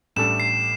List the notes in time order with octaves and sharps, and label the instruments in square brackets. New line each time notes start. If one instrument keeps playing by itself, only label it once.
[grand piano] A1 A2 G3 D4 A4 [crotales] E7
[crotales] C7